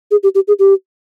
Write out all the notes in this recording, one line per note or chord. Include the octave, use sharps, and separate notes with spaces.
G#4
G4
G4
G#4
G4